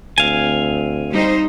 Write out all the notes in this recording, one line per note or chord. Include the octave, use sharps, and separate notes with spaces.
D2 C4 F5 G#5
G3 D#4 C5